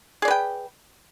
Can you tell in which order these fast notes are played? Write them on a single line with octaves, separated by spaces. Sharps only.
G#4 D5 B4 G5